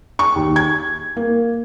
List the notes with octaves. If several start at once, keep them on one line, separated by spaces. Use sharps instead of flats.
C#6
D#2
G#6
A#3